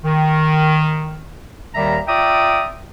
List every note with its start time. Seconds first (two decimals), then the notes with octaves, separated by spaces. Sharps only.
0.04 D#3
1.75 D#2 D#3 G3 E5 A#5
2.08 F4 D5 E5 G5 A#5 D#6